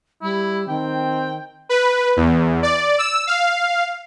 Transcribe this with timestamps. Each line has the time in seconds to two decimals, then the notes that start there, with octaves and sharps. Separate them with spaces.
0.22 G3 E4
0.68 D#3 C4 G5
1.69 B4
2.17 E2
2.63 D5
2.98 E6
3.27 F5